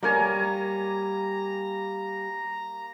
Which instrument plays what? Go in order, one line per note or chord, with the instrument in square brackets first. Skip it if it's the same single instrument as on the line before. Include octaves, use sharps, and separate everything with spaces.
[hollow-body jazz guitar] G3 A#4 C#5 [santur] A#3 G#5 [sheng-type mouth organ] A#5